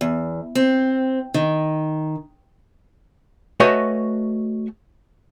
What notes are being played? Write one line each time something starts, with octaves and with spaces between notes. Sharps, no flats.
E2
C4
D#3
A3 F#4 B4 C#5 D#5 G#5